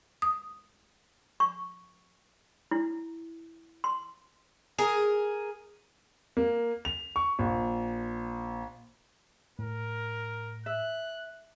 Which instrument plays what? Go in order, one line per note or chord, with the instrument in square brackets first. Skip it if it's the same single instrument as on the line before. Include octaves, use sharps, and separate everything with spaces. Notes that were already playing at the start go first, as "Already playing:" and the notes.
[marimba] D#6
[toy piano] C#6
E4
C6
[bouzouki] G#4 A#4
[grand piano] A#3
F7
C#6
A#1
[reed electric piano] A2 [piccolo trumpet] A#4
[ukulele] E5 [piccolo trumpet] F#6